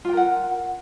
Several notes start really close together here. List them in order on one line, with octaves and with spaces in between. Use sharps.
F4 G5 A#4 F#5